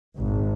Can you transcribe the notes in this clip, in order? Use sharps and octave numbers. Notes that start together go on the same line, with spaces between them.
G#1